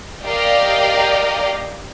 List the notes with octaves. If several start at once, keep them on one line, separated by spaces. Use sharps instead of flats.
G4 A#4 D5 D#5 F5 G5